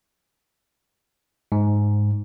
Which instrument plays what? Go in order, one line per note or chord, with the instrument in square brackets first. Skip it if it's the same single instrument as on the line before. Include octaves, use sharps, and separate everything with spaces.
[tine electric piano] G#2